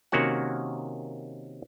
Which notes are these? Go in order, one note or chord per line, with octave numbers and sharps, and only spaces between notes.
C3 D#3 A#3 C#4 F#4 F#5